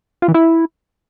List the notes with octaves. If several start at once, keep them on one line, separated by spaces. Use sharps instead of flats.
F4
E3
E4